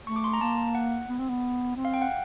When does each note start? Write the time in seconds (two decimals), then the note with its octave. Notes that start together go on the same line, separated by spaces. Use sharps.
0.07 A3 C#6
0.16 D6
0.24 C6
0.33 A#5
0.41 A#3 A5
0.75 F#5
1.09 B3
1.19 C4
1.29 B3
1.76 C4
1.85 F5
1.94 G5
2.02 F#5